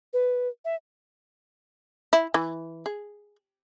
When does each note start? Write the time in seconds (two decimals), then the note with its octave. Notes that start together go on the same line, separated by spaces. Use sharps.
0.13 B4
0.65 E5
2.13 E4
2.34 E3
2.86 G#4